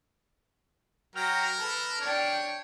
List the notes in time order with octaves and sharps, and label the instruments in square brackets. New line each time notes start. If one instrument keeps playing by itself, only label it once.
[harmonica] F#3 G5 A#5 [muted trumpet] A#4 [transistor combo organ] F6
[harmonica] A4 [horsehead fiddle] B4
[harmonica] D4 [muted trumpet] C#5 [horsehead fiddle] D5 G5